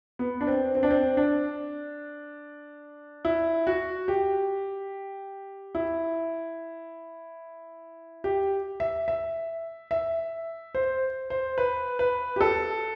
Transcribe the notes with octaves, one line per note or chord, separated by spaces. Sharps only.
B3
D4
C4
C4
D4
C4
D4
E4
F#4
G4
E4
G4
E5
E5
E5
C5
C5
B4
B4
G4
A4